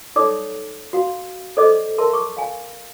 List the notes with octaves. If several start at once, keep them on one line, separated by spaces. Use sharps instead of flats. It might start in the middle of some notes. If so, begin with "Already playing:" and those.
D#4 A4 C#5 D5 D6 D#6
F#4 F5
A4 C5 D5 D#5 D6
A#4 E5 A5 C6
C#6 D6
F5 G#5